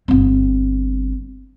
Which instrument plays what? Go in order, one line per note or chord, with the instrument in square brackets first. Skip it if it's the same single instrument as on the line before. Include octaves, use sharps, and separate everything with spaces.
[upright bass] G1 C4